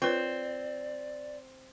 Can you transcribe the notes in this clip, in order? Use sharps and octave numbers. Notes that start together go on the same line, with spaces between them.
C4 F4 B4 C#5 D5